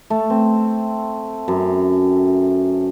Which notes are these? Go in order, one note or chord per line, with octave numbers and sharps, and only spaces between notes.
A3
C4
F#2